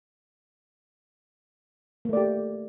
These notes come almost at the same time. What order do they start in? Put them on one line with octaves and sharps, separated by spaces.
A#3 A3 D5 G4